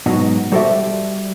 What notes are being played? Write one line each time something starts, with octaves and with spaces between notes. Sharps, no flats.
G#2 B2 F#3 D#4 F#4
G3 F#4 A4 C5 D5 E5